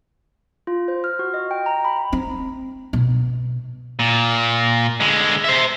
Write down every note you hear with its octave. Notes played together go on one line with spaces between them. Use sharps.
F4
C5
F6
F#4
D#5
G5
A#5
B5
C4
B2
A#2
D3 G#3
C5 E5